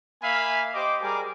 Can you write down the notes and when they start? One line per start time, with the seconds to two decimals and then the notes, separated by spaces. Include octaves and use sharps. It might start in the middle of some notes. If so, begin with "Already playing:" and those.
0.23 A#3 E5 F5 G#5 B5
0.74 G4 C5 D#5 D6
1.03 G3 G#4 A#4 G#5 D6